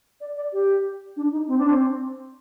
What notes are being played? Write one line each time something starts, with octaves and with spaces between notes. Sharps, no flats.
D5
D5
G4
D4
D#4
C4
D4
C4